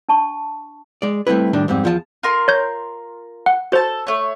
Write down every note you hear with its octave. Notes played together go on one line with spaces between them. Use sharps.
D4 A5 C#6
G#3 D5
G3 A3 C4 E4 B4
A2 D#3 G3 D4
F2 G#2 G3 C4
E2 F3 F4 E5 A5
F4 A#4 C6
C#5 G6
F#5
F#4 A4 C5 A5
A3 C#5